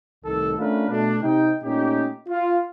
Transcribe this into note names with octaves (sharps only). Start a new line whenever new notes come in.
C2 A2 D#3 A4
A3 C#4 D4 F4 A#4 B4
B2 A3 D4
C3 D#4 G5
A#2 A3 C#4 D#4 G4
F4